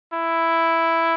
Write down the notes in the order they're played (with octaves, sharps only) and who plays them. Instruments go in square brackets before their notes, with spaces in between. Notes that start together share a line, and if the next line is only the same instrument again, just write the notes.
[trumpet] E4